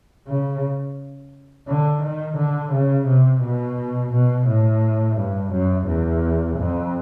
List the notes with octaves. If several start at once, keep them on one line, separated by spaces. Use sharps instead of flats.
C#3
D3
D#3
D3
C#3
C3
B2
B2
A2
G2
F#2
E2
F2